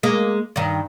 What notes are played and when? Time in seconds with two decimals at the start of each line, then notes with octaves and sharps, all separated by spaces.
0.03 G#3 A#3
0.56 G2 D#3